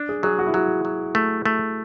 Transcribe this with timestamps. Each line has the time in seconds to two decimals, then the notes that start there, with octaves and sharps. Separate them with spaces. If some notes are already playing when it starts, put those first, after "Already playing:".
Already playing: D4
0.09 G#4
0.23 F#3 G#4
0.39 F#4
0.46 E4
0.54 F#3 F#4
0.85 F#3
1.15 A3
1.45 A3